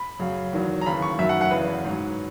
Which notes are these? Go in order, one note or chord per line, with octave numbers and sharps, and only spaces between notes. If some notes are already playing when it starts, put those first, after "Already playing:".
Already playing: B5
F#2 C#3 F#3
E2 D#3 F#3
A#5
D#2 C#3 E3 B5
C#6
F#2 D#3 F#3 E5
F#5
F#5
E2 C#3 E3 B4
G#2 F#3